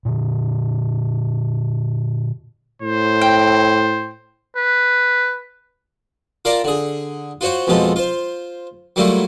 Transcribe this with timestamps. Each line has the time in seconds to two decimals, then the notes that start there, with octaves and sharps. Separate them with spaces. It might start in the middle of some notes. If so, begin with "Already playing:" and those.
0.05 A#2 D3
2.82 A2 C5
3.21 G5
4.56 B4
6.45 F4 A#4 D5 F5 A5 A#5
6.64 D3 G#4
7.41 F4 F#4 C5 C#5 F#5
7.67 F2 B2 F3 G#3 F4 A4
7.96 F4 C5
8.96 F#3 G3 A3 A#3 E4 F4